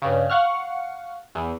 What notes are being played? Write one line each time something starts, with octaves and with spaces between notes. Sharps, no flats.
G2 C#3
F5 F#5 C#6 F6
E2